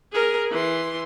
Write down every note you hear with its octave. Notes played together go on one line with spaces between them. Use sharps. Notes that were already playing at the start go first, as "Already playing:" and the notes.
G#4 A#4
E3 C6